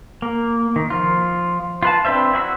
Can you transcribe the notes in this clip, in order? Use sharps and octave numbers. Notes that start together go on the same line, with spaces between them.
A#3
D#3
F3 F4
F4 B4 A5
C4 D4 B4 C5 E5
E4 F#4 B5 E6